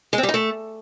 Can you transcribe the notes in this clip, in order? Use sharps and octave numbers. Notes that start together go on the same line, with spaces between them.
G#3
C4
G3
D#4
A3